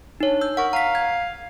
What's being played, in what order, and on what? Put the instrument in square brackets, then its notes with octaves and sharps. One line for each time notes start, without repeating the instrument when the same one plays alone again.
[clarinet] D4 [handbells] D#4 C#5
[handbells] E6 G6
[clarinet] A#4 [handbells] F#5 C#6
[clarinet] F5 [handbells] A#5 B6
[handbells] G#6